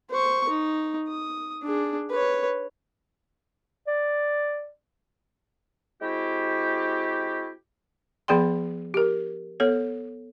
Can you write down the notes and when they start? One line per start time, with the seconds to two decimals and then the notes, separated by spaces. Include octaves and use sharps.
0.11 C5 C#6
0.49 D#4
1.08 D#6
1.63 D4 G#4
2.10 B4 C#5
3.87 D5
6.01 G#3 C4 E4 F#4 G4
8.28 F3 B3 G#4 D5 G5 C6
8.94 G4 A#4
9.60 B3 A4 C#5